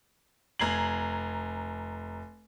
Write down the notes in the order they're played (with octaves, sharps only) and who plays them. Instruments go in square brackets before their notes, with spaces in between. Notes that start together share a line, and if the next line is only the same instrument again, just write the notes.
[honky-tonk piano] F1 A#5 G#6 C7 F#7